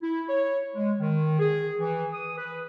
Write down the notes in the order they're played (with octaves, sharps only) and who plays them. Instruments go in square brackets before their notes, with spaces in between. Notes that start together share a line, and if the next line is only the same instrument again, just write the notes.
[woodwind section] E4
C#5
G#3
D#3
G#4
E3
D#6
B4